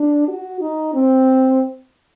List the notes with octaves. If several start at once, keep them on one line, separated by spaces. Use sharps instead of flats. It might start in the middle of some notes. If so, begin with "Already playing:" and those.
Already playing: D4
F#4
D#4
C4